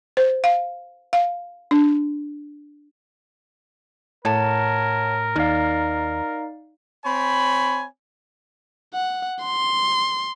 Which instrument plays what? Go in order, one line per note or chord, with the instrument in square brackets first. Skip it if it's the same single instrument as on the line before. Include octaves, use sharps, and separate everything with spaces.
[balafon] C5
F5
F5
D4
[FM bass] A2 [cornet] A#4 [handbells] C#5 F#5 A5
[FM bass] D#2 [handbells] D#4 D5 F5
[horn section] C4 C#5 G#5 B5
[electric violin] F#5
C6